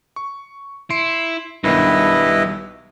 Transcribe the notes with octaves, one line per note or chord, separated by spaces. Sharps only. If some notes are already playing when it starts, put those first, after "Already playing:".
C#6
E4 C6 C7 D7
B1 G2 D#3 B3 E4 B4 D#5